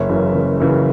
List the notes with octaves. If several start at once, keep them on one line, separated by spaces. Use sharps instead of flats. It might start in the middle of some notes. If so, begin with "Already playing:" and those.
Already playing: F#1 C#5 E5
F#2 C#3 E3
F#1
F#2 C#3 E3